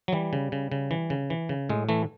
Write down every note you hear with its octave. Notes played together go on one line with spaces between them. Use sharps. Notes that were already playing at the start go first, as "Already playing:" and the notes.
F#3
E3 G3
C#3
C#3
C#3
E3
C#3
E3
C#3
A2 G#3
E3 A3